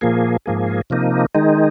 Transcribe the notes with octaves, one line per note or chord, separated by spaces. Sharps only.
A#2 F3 A#3 G#4
G#2 F3 A#3 G#4
C3 F3 A#3 D#4
D#3 G#3 D#4